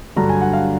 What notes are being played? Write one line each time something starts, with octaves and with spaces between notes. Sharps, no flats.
G2 D3 F#3 A#5
G#5
F#5
F5